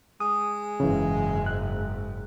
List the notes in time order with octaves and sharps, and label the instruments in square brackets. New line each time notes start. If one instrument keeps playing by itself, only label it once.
[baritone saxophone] G#3 [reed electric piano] D#6
[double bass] F#1 G#2 [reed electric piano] C#3 E3
[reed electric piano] F#6